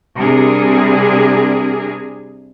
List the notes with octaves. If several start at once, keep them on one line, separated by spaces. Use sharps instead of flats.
C3 G3 D4 G#4 A#4